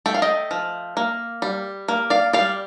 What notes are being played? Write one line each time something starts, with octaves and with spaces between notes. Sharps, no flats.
A3 G5
F5
D#5 G5
F3
A#3
G3
A#3
D5 F5
G3 D5 F5